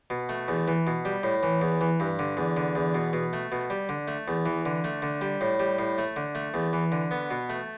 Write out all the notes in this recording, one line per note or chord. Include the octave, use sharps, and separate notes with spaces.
B2
A3
E2
E3
B2
G3
A2
E3
E2
E3
G2
D3
E2
D3
E2
B2
B2
A3
B2
G3
D3
A3
E2
E3
D3
A3
D3
G3
A2
G3
A2
A3
D3
A3
E2
E3
D3
B3
B2
A3